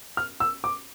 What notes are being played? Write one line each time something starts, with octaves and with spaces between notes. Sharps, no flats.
F6
E6
D6